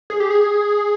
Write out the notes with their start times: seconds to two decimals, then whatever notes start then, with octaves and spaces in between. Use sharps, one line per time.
0.10 G#4
0.20 G4
0.30 G#4